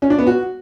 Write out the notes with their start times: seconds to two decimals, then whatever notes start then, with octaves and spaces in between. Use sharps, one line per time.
0.02 C#4
0.10 D4
0.18 B3
0.27 F#4